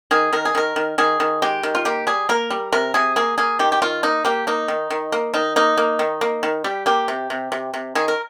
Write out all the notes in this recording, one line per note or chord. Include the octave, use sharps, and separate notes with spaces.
D#3 G#4
D#3 A#4
G#4
D#3 A#4
D#3
D#3 G#4
D#3
G#3 G4
D#3
F4
A#3 G4
G3 G#4
A#3 A#4
G3
C3 A#4
C3 G#4
A#3 G#4
A#3 G#4
D#3 G4
G4
D#3 F4
A#3 D#4
A#3 G4
A#3 D#4
D#3
D#3
A#3
D#3 D#4
A#3 D#4
A#3
D#3
A#3
D#3
G3 G4
A#3 G4
C3
C3
C3
C3
D#3 G#4
A#4